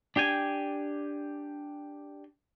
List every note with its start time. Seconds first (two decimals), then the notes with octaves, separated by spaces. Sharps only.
0.16 D4 G4 G5 G#5